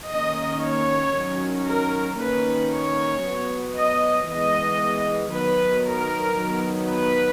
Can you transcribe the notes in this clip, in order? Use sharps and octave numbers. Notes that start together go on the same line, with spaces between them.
D#3 A#3 C#4 D#5
C#5
D#3 F#3 C#4
A#4
D#3 A#3 C#4 B4
C#5
F#3 B3
D#5
E3 G#3 B3 D#5
D#3 F#3 B3 B4
A#4
D#3 F#3 B3
B4